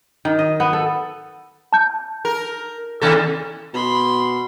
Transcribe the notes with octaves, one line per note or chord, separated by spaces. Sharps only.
D#3
D#5
B3
A4
A5 G6
A#4
D#2 C3 A4
B2 B5 C6